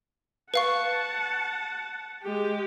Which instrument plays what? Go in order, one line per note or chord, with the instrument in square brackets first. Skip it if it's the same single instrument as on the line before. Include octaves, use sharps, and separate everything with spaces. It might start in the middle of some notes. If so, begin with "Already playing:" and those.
[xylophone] B4 F5 C#6 [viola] F#5 A5
[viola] G#3 G4